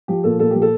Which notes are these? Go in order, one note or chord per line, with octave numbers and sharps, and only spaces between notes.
F3 G4
A#2 A4
A#2 A4
F3 G4
A4